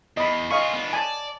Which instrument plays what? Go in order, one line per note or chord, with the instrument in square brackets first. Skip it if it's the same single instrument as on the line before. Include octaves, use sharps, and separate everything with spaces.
[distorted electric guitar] E2 [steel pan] D#5 B5
[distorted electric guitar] F4 G#4 [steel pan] D#5 F5 C#6
[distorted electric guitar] B3 D4
[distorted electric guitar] D5 [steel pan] G#5 A5